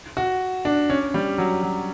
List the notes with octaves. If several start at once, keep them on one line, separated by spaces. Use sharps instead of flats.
F#4
D4
C#4
G3
F#3
F#3